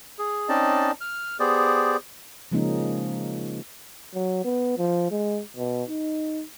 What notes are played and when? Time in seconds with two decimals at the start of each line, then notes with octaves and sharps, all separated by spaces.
0.19 G#4
0.49 C4 C#4 D#4 D5 D#5 A5
1.01 F6
1.40 B3 G4 G#4 C5 D5
2.52 C#3 F3 G#3 A#3 C#4 D#4
4.14 F#3
4.45 B3
4.78 F3
5.11 G#3
5.57 B2
5.89 D#4